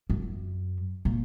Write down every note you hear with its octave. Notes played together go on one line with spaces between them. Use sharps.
F#2
A#2